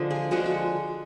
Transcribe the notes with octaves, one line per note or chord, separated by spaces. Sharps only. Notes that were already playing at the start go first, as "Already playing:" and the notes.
Already playing: D3 F3 G#3
G#4
D3 F3 G#3 F#4
F#4